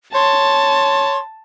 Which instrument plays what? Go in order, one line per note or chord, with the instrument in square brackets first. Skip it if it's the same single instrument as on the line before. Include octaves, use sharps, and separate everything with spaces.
[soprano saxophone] C#5 [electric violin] A5 [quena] C6